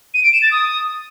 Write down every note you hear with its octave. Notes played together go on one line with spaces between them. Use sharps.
D#7
D7
E7
A6
D#6